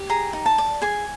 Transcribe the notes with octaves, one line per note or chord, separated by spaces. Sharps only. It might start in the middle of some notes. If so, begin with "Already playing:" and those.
Already playing: G4
G#4 A#5
D#4
A5
D5
G#4 G#5